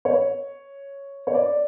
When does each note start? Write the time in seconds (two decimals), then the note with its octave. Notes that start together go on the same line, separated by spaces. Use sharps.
0.05 C#5
1.27 C#5
1.34 D5